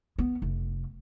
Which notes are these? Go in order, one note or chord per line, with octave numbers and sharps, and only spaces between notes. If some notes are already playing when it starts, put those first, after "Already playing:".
B3
F1